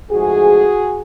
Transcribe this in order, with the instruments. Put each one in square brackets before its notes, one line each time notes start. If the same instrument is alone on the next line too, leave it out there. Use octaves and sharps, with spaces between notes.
[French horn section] G#2 F3 A3 F#4 G#4